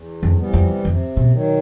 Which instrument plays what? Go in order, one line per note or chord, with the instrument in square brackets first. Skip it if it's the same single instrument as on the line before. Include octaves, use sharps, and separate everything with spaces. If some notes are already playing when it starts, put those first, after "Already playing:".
Already playing: [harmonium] E2
[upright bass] F2
[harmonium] C3 E3 G3 B3
[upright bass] F2
[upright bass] F2 [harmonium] C3
[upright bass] B2
[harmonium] D#3 F#3